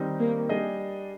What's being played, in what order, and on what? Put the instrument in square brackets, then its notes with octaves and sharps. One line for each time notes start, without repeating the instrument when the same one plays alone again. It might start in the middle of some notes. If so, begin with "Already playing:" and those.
Already playing: [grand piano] D#3 G3 C4 D#4 G4
[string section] A#3
[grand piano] G3 D4 G#4 D#5